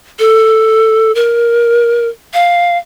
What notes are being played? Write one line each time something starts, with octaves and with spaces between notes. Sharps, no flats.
A4
A#4
F5